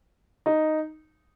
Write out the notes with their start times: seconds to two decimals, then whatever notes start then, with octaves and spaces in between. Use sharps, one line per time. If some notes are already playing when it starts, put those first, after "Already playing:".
0.46 D#4